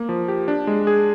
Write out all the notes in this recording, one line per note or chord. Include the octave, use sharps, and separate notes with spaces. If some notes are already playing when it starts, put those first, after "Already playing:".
Already playing: A#3
F3
G4
D4
G#3
G#4